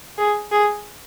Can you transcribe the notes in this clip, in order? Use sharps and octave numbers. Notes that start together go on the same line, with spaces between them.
G#4
G#4